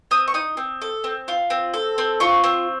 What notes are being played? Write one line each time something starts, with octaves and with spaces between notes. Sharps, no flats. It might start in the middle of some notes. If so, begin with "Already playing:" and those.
C4 D#6
C#6
D#4 D#6
C4
A4
C4
F4
C4
A4
C4
F4 C#6
C4